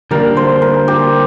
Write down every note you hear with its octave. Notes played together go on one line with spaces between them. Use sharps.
D3 G3 A#3 D4 A#4
C5
A#4
G4